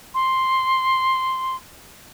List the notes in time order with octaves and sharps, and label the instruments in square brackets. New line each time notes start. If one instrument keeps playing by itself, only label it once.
[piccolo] C6